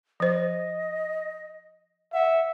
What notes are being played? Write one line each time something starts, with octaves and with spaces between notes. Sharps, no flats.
F3 C5 D#5
E5 F#5